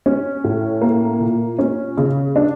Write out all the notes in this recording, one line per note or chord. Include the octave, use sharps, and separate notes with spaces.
C#4
A2
A#3
A#2
C#4
C#3
D4